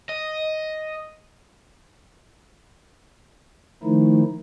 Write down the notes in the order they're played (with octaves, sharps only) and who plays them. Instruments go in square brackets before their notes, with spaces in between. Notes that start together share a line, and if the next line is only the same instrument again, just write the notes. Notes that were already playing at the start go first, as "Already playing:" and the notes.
[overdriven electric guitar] D#5
[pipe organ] D#3 F3 A3 D#4 E4